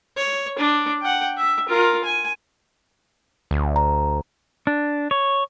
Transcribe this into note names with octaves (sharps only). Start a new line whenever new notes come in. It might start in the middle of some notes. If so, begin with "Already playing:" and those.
C#5
D4
F#5 G5
E5
F4 A#4
G#5
D2
A#5
D4
C#5